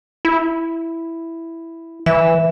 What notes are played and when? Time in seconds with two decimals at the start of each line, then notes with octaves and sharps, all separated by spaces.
0.25 E4
2.06 E3 E5